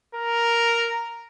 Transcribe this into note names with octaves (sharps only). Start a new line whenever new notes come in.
A#4